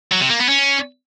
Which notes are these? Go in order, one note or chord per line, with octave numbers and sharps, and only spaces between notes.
F#3
C3
A#3
B3
C#4